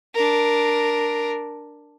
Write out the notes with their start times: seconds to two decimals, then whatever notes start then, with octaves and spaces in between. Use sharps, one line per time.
0.15 D4 A#4